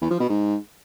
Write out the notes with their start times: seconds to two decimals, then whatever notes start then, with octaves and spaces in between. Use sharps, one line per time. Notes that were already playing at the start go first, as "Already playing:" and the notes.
0.02 E2
0.11 F3
0.20 B2
0.29 G#2